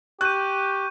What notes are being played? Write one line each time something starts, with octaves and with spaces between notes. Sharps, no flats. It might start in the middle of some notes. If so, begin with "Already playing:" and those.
G4 C#6 F#6 G6 D#7